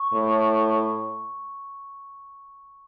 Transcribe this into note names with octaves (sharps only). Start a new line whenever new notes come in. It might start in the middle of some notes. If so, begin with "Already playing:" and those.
Already playing: C#6
A2